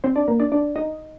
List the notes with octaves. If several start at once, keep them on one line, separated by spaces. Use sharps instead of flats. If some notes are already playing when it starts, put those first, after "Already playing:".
C4 C5
D4 D5
A#3 A#4
D4 D5
D4 D5
D#4 D#5